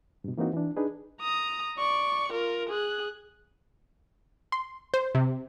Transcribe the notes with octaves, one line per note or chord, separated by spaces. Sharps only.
G2 B2
E3 A#3 C4 D#4 F#4
E3 D4
D4 D#4 G#4 B4
A#5 D#6
D5 C#6
F4 A#4
G#4 F#6
C6
C5
C3